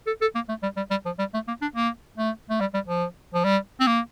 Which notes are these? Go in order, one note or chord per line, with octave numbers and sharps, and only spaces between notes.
A4
A4
A#3
A3
G3
G3
G3
F3
G3
A3
A#3
D4
A#3
A3
A3
G3
G3
F3
F3
G3
C4
A#3